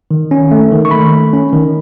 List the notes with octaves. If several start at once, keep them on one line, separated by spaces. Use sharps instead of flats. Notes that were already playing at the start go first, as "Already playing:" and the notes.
D#3
C#4
A3
D#3
C#6
A3 B5
A3
C#4
D#3